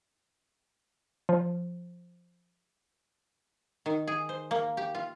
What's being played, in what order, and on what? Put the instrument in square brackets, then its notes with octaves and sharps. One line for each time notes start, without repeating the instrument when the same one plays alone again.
[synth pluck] F3
[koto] D#3
G#4
C5
A#3
G4
F4